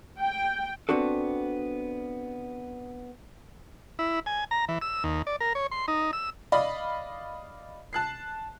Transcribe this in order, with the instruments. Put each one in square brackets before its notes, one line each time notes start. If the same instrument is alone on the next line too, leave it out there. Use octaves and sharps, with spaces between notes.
[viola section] G5
[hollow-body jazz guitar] B3 C4 D4 F#4 A4
[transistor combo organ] E4
G#5
A#5
E3
E6
D#2
D5
A#4
C#5
C6
D#4
E6
[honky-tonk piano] D5 D#5 F5 B5
A5 F#6 C7